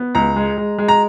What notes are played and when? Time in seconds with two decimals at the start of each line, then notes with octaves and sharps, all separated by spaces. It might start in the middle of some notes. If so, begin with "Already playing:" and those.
Already playing: B3
0.15 C#2 A#5
0.36 G#3
0.57 G#3
0.78 G#3
0.88 A#5